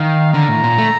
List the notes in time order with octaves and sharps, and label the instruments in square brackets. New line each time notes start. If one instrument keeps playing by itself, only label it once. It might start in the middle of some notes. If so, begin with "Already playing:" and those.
Already playing: [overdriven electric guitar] D#3 [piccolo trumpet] F5
[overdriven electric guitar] D3 [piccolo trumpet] A#5
[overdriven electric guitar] A2
A#2
A3